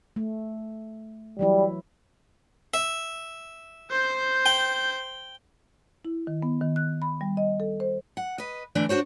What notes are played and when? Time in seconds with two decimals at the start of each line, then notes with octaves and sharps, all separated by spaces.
0.16 A3
1.39 E3 F#3 G3 E4
2.74 E5
3.91 C5 G6
4.46 G5
6.05 E4
6.27 D#3
6.43 B3
6.61 D#3
6.76 F#6
7.02 B5
7.21 G3
7.37 D#5
7.60 A4
7.80 C5
8.17 F#5
8.38 B4 D#5
8.75 D3 E3 A3 D4
8.89 D4 D#4 F#4 C5 C#5